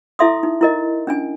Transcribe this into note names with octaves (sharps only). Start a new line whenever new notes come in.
E4 A4 E5 C6 D#6
D#4
E4 A#4 D#5
C#4 D4 G#5